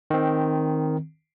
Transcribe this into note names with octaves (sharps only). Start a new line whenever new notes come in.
D#3 C4